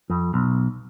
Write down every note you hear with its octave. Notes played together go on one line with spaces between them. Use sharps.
F2
B1